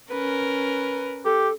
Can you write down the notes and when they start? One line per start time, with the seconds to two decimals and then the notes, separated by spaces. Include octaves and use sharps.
0.11 C#4 A#4 B4
1.25 G4 A4